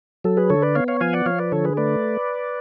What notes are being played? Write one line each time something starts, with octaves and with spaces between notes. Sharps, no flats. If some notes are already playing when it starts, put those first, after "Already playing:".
F#3 A4
G#4 B4
D3 A4 C#5
B4 D5
B3 C#5 F5
C#5 F5
F3 F5 G#5
D5 F#5
F3 C#5 F5
B4 D5
D3 A4 C#5
G#4 B4
A3 B4 D5